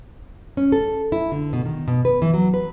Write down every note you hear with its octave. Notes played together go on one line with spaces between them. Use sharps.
C#4
A4
E4
D3
B2
D#3
B2
B4
E3
F#3
B4